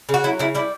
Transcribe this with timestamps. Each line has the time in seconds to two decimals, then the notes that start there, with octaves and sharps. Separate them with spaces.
0.09 C#3
0.14 F#4
0.24 F#3 E4
0.39 C#3 E4
0.55 G3 E4